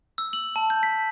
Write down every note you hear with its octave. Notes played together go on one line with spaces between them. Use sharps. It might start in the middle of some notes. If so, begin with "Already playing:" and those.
E6
F#7
A5
G6
B6